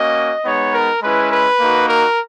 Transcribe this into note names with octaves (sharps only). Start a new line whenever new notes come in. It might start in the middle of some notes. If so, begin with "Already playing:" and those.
Already playing: A#3 C#4 F#4 D#5
G#3 B3 D#4 C#5
A#4
G#3 C#4 E4 B4
B4
A#3 D#4 F#4
A#4